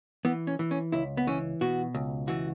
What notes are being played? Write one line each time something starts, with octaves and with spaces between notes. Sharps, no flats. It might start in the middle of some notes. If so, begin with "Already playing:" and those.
E3 B3
C#4
E3
C#4
C#2 E4
B3
E3 C#4
B2 F#4
C#2
E3 F#4